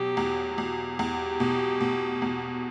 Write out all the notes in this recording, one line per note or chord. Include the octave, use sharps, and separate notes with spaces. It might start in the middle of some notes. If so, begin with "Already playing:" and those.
Already playing: B2 F#3 G4
E2
E2
E2 G4
B2
B2
E2